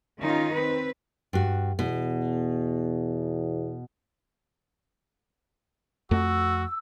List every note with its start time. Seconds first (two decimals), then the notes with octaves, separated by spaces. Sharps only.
0.21 D#3 C#4 D#4 F4
0.54 C4 B4
1.33 G2 F#4
1.79 E2 B2
6.11 F2 A3 F#4 E6